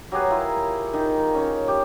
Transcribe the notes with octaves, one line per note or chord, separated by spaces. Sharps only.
F#3 G4 G#4 B4
E4 F4 A#4
D#3 D#4
C#4 C#5
G4